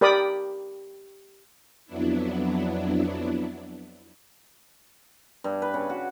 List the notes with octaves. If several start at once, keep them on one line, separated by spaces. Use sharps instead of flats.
G4 A#4 D5 B5 D#6
F2 F#3 B3 D4 E4
G2
B4
C#3
F#4